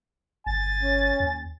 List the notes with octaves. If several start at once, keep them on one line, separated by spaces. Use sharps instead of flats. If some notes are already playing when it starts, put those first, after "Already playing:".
G1 G#5 A6
C#4
D#2